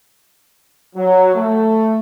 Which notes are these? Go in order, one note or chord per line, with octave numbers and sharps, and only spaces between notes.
F#3
A3